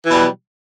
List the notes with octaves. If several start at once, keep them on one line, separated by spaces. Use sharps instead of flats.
B2 E3 F#3 G3